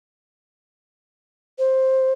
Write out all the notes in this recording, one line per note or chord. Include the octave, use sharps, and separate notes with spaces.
C5